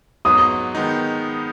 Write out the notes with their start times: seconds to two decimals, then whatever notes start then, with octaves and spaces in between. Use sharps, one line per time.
0.25 G#2 F#3 B3 D#6
0.75 D#3 G#3 B3 D#4